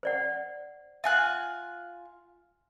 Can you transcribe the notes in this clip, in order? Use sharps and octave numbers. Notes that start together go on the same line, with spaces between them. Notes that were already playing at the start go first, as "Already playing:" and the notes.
C5 D5 F#5
F4 E5 F#5 G#5 F#6